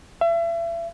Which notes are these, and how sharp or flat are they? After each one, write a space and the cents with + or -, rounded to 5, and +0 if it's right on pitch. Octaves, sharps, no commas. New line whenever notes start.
E5 +35